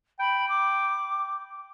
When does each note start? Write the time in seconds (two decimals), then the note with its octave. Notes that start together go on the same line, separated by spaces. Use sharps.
0.20 G5 B5
0.48 D6